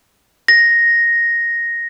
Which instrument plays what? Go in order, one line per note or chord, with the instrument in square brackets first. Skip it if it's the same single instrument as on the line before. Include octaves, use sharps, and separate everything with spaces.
[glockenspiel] A#6